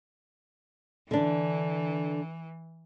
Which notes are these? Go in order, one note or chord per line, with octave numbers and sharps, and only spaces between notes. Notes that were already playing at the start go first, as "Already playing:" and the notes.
D3 E3 D4